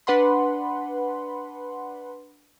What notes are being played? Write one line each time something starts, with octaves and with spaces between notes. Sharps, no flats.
D4 B4 F#5 B5 C6